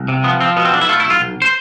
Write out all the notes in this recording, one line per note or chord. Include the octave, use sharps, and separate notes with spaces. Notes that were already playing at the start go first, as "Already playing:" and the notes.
Already playing: C2
C3
F3 B3
F3 C4
B2 B3
C4
B1 D4
E4
A3 F4
E4
B1
F4
B1
C5